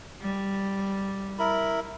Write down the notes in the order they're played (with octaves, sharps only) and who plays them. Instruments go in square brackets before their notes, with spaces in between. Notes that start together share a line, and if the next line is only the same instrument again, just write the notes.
[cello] G3
[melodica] E4 A#4 B5